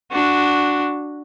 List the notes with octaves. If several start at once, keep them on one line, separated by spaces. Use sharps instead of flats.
D4 F#4